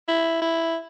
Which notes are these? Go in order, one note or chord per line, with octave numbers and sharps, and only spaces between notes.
E4
E4